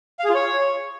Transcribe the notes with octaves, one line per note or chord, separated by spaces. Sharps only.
F5
G#4
F4
C#5